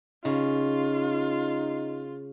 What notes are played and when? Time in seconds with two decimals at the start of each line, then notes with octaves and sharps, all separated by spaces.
0.25 C#3 D#4 F4